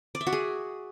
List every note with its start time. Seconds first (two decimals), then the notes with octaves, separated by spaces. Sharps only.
0.15 D5
0.21 E5
0.27 F#4
0.33 G#4